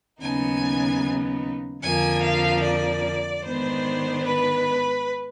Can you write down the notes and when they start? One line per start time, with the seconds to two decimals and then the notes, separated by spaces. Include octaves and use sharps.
0.21 D#2 C#3 F#3 B3 D#4 G#5
1.82 F2 D3 F3 A#3 G#5
2.22 F5
2.63 D5
3.44 G#2 D#3 G#3 B3 D4 C5
4.25 B4